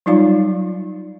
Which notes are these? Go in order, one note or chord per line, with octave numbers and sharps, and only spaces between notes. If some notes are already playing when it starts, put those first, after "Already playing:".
F#3 G3 D#4 F4 D5 F5